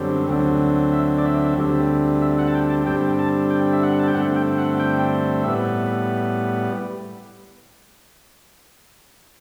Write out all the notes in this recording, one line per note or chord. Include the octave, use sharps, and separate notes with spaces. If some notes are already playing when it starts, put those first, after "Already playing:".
Already playing: F#2 D3 G3 C4
D2 D3 F#3 C4
E5
D5
E5
D2 D3 G3 C4
E5
F#5
A5
G5
A5
G2 D3 G3 C4 G5
A5
G5
E5
F#5
A5
G5
G2 D3 A3 C4 F#5
G5
F#5
G5
A2 G3 B3 E5